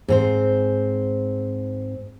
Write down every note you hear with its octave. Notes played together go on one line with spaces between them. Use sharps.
G#2 C4 C5